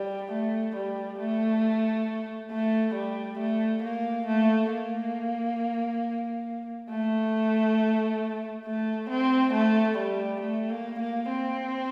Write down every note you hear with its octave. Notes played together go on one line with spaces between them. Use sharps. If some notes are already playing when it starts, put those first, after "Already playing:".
Already playing: G3
A3
G3
A3
A3
G3
A3
A#3
A3
A#3
A3
A3
C4
A3
G3
A3
A#3
A#3
C4